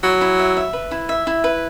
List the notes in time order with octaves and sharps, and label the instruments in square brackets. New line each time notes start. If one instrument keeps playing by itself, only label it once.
[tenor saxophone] F#3 [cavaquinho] E4
[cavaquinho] E4
E5
E5
B4
E4
E5
E4
B4